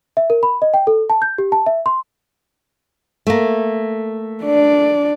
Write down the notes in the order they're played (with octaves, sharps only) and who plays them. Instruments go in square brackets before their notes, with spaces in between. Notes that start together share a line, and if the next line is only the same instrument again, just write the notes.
[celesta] E5
A#4
B5
D#5
G5
A4
A5
G6
G4
A5
E5
C6
[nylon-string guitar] A3 A#3
[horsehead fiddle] D4 D5